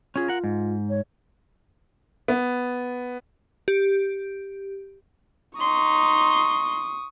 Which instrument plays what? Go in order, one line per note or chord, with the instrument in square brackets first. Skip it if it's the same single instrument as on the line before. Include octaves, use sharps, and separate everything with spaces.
[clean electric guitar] C#4 G#4 [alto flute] F4
[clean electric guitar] A#4 F#5
G#2
[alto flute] C#5
[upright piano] B3
[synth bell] G4
[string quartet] D#4 C6 [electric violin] C#6 D#6